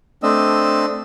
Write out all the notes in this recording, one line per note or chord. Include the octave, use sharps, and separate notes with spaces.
A3 C4 D4 D#5 E6